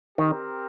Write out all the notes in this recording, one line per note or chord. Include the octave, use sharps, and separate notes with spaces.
D#3 C4 G4 A#4